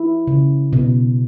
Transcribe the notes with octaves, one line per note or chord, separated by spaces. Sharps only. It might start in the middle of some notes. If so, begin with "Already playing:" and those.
Already playing: E4
C#3
B2